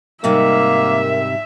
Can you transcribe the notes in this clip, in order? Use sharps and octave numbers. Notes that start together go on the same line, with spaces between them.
G#2 C3 G3 A#3 A#4 E5